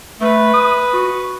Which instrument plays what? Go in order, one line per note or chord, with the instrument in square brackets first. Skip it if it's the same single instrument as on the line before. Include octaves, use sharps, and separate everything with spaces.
[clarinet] A3 [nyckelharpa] B4
[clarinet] D#6
F#4